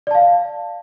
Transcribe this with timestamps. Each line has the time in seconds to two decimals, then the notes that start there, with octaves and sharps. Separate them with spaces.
0.07 D5
0.11 A5
0.15 F5